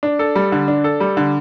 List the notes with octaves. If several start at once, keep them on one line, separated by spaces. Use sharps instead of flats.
D4
A4
G3
D3
D4
A4
G3
D3